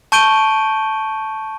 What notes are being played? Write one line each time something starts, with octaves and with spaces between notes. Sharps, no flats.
A5 C#6 G6 D7 D#7 G7